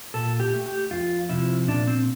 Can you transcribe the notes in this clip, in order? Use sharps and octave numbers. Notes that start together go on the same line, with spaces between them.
A#2 A4
G4
A3
G4
F2 F4
C3 F3 E4
A#2 D4
C4